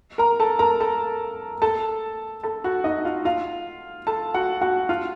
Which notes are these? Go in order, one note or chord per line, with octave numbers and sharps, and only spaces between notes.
A#4 A#5
A4 A5
A#4 A#5
A4 A5
A4 A5
A4 A5
F#4 F#5
D#4 D#5
F4 F5
F4 F5
A4 A5
F#4 F#5
F#4 F#5
F4 F5